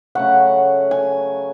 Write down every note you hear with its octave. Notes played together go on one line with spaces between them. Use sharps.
C#3 F#3 A3 F#5
G#5